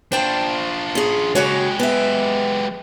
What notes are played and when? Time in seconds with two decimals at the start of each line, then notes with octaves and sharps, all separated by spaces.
0.12 D4 F4 C5 G5 A5
0.95 C#4 G#4
1.35 C#3 G#3 F#4 G4 C#5
1.79 B3 E5